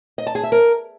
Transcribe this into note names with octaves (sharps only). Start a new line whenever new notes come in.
D#5
A5
G#4
E5
A#4